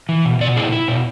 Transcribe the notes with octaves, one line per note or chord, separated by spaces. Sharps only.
E3
B2
B2 D5
E4 G#4
E4
B2